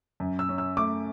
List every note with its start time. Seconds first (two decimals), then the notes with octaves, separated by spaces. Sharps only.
0.20 F#2
0.39 E6
0.49 C#4
0.58 E6
0.77 A3 D6